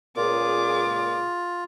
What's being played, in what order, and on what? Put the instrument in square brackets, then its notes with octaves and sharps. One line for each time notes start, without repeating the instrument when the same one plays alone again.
[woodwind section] C#2 A#2 [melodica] F4 [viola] G#4 D6